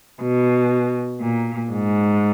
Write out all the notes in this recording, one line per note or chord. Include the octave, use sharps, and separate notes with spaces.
B2
A#2
G#2